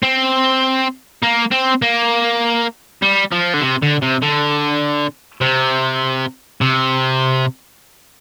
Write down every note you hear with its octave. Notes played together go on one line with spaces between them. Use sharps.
C4
A#3
C4
A#3
G3
F3
D3
C3
D3
C3
D3
C3
C3